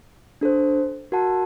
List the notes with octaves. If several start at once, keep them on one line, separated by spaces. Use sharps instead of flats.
D4 A4 C5
F#4 A#4 F#5 A5